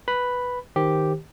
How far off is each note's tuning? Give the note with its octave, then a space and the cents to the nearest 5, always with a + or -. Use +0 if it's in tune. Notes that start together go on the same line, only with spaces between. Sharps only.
B4 +0 B5 +0
D#3 +0 G4 +0 C5 +0